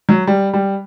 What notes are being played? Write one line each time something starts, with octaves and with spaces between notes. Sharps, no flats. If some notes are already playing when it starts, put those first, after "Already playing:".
F#3
G3
G3